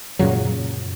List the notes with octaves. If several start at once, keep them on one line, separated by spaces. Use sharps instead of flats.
F#2 A#2 C#3 F#3